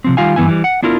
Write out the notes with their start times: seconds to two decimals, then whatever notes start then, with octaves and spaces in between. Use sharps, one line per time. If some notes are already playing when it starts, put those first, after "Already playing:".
0.04 C3 F3 C4
0.17 D#3 G3 F4 F5 G#5
0.36 G2 E3 B3 E4 G#5
0.48 E3 G3
0.64 F#5
0.83 B3 D4 E4 F4 A#4